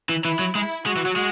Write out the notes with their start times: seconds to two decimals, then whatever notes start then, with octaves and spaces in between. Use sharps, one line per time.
0.09 E3
0.24 E3 E4
0.39 F#3
0.55 G#3 E4
0.85 G#3 F#4
0.96 E3
1.06 F#3
1.16 G#3